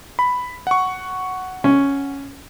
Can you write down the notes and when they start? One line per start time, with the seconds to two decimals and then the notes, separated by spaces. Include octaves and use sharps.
0.19 B5
0.67 F#5 C#6
1.64 C#4